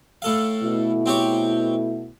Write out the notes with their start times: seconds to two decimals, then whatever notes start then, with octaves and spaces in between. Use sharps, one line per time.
0.22 A2 A4 F5
0.63 B2 A3 E4
1.06 C4 G4 C#5